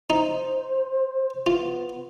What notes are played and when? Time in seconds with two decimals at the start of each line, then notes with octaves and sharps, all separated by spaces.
0.10 D#4 C5
1.46 B3 F4